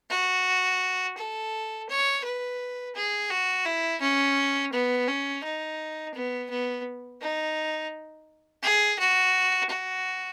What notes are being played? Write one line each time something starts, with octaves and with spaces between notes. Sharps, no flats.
F#4
A4
C#5
B4
G#4
F#4
E4
C#4
B3
C#4
D#4
B3
B3
D#4
G#4
F#4
F#4